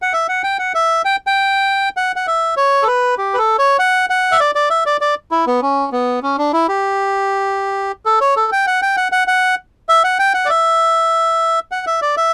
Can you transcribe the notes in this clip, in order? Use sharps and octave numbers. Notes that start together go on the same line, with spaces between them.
F#5
E5
F#5
G5
F#5
E5
G5
G5
F#5
F#5
E5
C#5
A4
B4
G4
B4
A4
C#5
F#5
F#5
E5
D5
D5
E5
D5
D5
E4
B3
C#4
B3
C#4
D4
E4
G4
A4
C#5
A4
G5
F#5
G5
F#5
F#5
F#5
E5
F#5
G5
F#5
D5
E5
F#5
E5
D5
E5